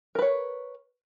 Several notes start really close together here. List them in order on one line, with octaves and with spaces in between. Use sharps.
A#4 B4 C#5